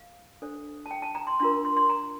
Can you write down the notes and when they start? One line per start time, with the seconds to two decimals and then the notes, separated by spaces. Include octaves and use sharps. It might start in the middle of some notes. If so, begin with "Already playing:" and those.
Already playing: F5
0.42 D4 A4 C5
0.86 A5
0.91 G5
1.02 A5
1.15 A#5
1.27 C6
1.40 D4 F4 A#4 C6
1.65 C6
1.77 C6
1.90 A#5